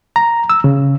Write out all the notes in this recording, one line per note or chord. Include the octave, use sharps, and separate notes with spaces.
A#5
E6
C#3